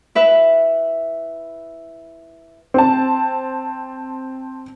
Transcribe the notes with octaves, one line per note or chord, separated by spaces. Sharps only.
E4 B4 E5
C4 A5